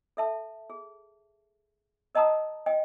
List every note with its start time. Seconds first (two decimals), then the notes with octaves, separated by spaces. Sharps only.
0.17 A4 E5 A5
0.70 G#4
2.15 A#4 D#5 F#5 A5 A#5 D#6
2.66 D#5 G5 G#5